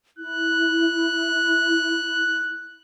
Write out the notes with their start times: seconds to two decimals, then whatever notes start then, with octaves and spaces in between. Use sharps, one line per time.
0.19 E4 F#6